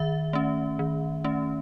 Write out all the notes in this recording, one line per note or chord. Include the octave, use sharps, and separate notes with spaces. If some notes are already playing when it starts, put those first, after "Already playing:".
Already playing: D#3 E5
A3 C#4
D#3
A3 C#4